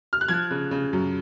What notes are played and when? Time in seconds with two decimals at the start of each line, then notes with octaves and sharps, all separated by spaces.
0.13 F6
0.21 F#6
0.28 F3 G#6
0.51 C#3
0.71 C#3
0.93 F#2